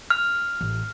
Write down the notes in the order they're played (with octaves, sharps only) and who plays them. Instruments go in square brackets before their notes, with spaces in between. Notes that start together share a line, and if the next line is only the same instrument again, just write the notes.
[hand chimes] F6
[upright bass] A1